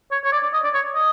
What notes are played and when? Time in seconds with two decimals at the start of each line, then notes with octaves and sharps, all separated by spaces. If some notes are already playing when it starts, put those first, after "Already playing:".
0.11 C#5
0.24 C#5
0.32 D5
0.42 D5
0.53 D#5
0.64 D5
0.74 C#5
0.95 D#5